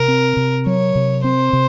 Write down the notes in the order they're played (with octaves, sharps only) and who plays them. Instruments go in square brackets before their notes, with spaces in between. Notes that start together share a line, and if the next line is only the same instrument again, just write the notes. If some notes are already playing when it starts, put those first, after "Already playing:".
Already playing: [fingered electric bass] C3 [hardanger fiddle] A#4
[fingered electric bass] C4
C3
[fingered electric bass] F#3 [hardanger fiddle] C#5
[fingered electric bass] C3
[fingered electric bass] C4 [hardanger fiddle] C5
[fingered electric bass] C3